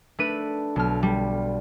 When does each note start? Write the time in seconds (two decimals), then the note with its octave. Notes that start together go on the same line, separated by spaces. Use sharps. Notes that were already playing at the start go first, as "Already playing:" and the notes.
0.19 A3 D4 B4 D#7
0.76 B1 F6
1.03 G3